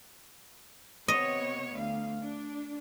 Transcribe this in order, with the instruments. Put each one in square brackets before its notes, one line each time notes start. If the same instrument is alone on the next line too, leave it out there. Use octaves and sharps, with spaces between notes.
[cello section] C3 B3 C#5 [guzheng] D#5
[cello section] D2 F5
D4